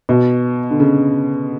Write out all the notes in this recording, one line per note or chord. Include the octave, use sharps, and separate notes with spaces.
B2
D3
C#3